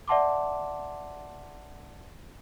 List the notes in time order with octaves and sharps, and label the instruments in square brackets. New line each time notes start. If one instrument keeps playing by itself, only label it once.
[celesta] D5 E5 F#5 A5 C6 D6